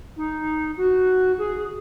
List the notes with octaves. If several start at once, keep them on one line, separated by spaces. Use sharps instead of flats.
D#4
F#4
G#4